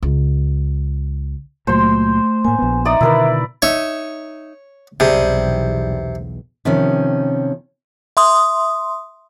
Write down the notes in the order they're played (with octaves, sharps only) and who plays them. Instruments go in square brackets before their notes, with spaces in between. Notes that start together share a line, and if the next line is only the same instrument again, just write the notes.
[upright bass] C#2
[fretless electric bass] C#2 A#2 F#3 [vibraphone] A3 [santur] C5 C6
[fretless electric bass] A2 A#3 [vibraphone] G#5
[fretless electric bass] A#1 B3
[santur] D#4 D5 D#6 [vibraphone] E5 A#5
[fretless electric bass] B2 D3 D#3 [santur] E4 A#4 B4
[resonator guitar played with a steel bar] D#4 E5 [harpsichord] C#5
[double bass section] B1 E2 [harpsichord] C3 [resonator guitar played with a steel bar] G3 G#4
[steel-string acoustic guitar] C3 D#3 F3 C#4
[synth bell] E5 C6 D#6